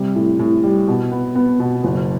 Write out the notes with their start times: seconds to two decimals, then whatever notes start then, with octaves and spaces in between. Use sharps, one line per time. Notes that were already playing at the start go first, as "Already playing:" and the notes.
Already playing: C3 G3
0.15 A2
0.39 A2
0.64 G3
0.88 B2
1.12 B3
1.35 B3
1.59 B2
1.84 F#1